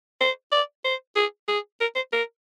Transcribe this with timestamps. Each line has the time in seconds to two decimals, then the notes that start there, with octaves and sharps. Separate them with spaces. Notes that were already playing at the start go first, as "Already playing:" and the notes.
0.21 C5
0.52 D5
0.85 C5
1.16 G#4
1.48 G#4
1.81 A#4
1.96 C5
2.13 A#4